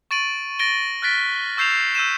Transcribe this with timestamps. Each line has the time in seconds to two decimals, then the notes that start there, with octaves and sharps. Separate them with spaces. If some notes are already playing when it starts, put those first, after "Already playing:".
0.11 C#6 A6 D7 D#7 F#7
0.59 A6 A#6 D7 G7
1.02 F6 F#6 A6 B6 D7
1.57 C#6 E6 G6 C7 E7 F7
1.71 C7
1.95 E6 G6 D#7 E7